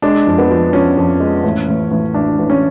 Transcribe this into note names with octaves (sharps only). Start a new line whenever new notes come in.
G#3 D4
F2
B3
F3
F3 C#4
F2
G#3
A1
A1
A1
A1 D4
A1
C#4